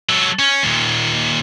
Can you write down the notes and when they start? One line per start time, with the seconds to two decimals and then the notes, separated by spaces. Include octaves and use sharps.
0.09 F#3 A4
0.39 C#4
0.63 D#2 A#2